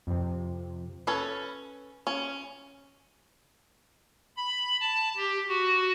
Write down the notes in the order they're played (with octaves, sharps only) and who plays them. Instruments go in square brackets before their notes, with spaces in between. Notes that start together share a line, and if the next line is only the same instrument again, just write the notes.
[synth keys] F2 C3
[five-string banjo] C#4 A4 B4
C#4
[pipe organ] B5
A5
G4
F#4